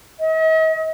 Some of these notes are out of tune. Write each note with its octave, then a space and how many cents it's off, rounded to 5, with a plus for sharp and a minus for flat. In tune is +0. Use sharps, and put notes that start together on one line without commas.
D#5 +45